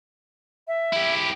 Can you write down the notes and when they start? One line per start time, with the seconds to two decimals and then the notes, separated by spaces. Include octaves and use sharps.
0.68 E5
0.93 E4 G4